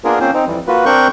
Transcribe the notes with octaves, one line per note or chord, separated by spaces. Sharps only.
A#3 B3 D4 F4 G#4 A#4
A#3 C4 C#4 F4 C5
C4 D#4
F2 E3 G3
A#3 F4 F#4 B4
C4 D4 A#4 C#6 F#6 G6